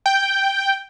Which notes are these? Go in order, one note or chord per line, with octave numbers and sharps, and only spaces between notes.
G5